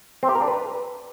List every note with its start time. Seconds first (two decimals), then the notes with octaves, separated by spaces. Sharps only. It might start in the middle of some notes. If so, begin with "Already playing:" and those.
0.23 C4
0.29 G4
0.35 A#4
0.42 D4
0.48 B4